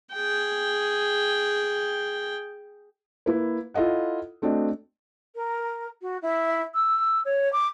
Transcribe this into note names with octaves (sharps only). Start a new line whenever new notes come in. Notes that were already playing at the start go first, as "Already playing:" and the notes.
G#4 G5
A#3 E4 B4
E4 F4 A4 D#5 F#5
A3 C4 D4 F#4 D#5
A#4
F#4
E4
E6
C#5
D6